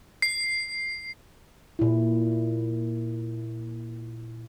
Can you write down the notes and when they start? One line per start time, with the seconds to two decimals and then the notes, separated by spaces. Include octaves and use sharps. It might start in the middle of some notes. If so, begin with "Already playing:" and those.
0.22 C7
1.79 A#2 E4